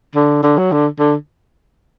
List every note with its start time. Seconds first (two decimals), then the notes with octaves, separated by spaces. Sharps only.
0.15 D3
0.43 D3
0.58 F#3
0.72 D3
0.99 D3